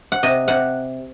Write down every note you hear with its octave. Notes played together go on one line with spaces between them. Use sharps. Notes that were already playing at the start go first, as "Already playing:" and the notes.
F#5
C3 D#5
C3 F#5